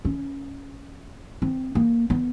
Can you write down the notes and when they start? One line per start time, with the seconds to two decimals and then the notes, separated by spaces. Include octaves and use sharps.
0.05 C#4
1.42 C4
1.75 A#3
2.10 B3